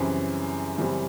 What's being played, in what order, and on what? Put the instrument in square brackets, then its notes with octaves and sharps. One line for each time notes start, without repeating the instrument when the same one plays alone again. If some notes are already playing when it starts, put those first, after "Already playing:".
Already playing: [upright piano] F#2 C#3 E3 G3 C4
F#2 C#3 E3 G3 C4